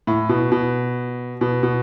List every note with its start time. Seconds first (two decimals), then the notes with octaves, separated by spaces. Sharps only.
0.07 A2
0.29 B2
0.52 B2
1.41 B2
1.63 B2